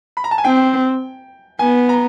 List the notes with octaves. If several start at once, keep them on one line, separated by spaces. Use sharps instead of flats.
B5
A#5
A5
G#5
C4 G5
B3 G#5
A#5